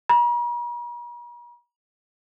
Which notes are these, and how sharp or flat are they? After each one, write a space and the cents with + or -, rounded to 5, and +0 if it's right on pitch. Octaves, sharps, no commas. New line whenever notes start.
A#5 +45